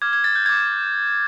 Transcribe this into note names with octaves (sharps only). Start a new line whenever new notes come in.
D6 F6 G#6
G#6
A6
G6
D6 G6 G#6